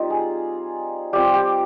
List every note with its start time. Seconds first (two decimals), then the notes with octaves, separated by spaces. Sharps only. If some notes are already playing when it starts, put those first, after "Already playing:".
Already playing: G3 C4 D#4 F4
0.10 G#4
1.13 G3 C4 F4 G4
1.33 G4